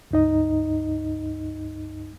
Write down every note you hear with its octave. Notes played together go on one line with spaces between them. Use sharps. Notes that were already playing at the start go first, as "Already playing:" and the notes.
C#2 G2 D#4 D#5